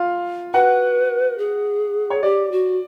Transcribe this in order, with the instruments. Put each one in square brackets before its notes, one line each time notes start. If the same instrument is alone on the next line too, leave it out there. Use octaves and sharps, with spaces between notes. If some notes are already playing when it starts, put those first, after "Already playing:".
Already playing: [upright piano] F4 F5
[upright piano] F#4 F#5 [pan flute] B4
[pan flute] G#4
[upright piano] C#5
[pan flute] G4 [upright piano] D5
[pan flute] F#4